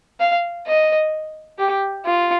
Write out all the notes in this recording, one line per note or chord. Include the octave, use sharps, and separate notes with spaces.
F5
D#5
G4
F4